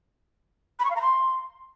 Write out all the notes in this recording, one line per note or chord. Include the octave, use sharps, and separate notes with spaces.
B5
C#6
F5
A#5
C6